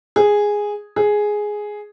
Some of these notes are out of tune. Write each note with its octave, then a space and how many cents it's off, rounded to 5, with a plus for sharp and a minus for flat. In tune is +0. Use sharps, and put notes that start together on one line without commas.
G#4 -5
G#4 +5